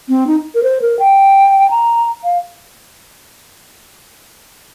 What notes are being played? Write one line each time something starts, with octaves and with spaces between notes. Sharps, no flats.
C4
D#4
A#4
C5
A#4
G5
A#5
F5